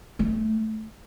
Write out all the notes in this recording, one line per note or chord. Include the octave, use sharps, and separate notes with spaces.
A3